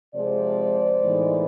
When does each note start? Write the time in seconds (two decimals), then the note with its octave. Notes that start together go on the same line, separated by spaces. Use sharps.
0.14 C3 F3 G#3 C5 D5
1.03 A2 E3 G#3 B3 D#4